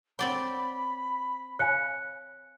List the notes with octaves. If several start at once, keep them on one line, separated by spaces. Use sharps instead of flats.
C4 C#5 D5 F#5 G5 B5 D6
C#5 F5 G#5 F#6 C#7